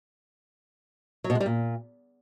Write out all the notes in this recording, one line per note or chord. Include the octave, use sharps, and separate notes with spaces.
F#3
B2
G#3
G3
A#2